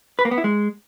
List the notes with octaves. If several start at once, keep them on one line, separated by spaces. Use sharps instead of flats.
B4
A#3
B3
E4
G#3